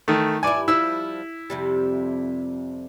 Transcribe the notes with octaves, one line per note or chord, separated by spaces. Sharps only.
E2 D#3 A3
G2 E4 D5 G#5
F3 G3 E4 E6
F2 C3 G3